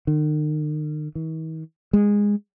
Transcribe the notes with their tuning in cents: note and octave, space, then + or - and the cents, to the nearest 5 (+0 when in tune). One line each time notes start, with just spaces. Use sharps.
D#3 -40
D#3 +45
G#3 -15